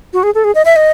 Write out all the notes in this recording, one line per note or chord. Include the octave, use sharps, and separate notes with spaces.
F#4
G#4
A4
G#4
D#5
E5
D#5